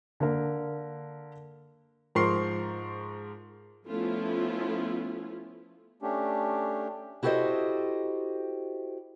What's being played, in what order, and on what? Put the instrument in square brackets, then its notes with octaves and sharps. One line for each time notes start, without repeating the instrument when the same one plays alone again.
[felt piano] D3 A#3 A#4
[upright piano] G#2 F3 A#4 C6 C#6 C7
[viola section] F3 A3 B3 C#4 E4 F4
[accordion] A3 C#4 D4 G4
[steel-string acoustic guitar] E4 F#4 G4 A4 C5 D#5